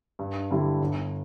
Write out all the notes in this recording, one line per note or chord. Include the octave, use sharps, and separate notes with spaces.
G2
D3 G3 E4
G1